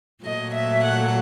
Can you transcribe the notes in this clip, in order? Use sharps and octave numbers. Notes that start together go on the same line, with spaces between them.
A#2 F#3 A3 D#5
E5
F#5